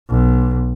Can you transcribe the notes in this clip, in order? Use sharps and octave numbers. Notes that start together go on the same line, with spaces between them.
B1